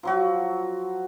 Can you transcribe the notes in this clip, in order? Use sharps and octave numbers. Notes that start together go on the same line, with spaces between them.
F3 F#3 F#4